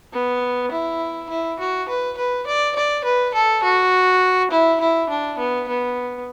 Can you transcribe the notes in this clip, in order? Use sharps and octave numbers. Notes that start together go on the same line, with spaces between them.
B3
E4
E4
F#4
B4
B4
D5
D5
B4
A4
F#4
E4
E4
D4
B3
B3